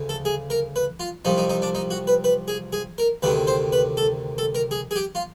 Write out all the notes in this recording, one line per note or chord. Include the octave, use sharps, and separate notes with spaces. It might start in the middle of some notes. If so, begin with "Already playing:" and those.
Already playing: D2 C#3
A4
G#4
A#4
B4
F4
C2 C3 F3 D#4
D#4
D#4
D4
D#4
F#4
B4
B4
G#4
G#4
A#4
D2 C3 D#3 B4
C5
B4
A4
A4
A#4
G#4
G#4
G4
F4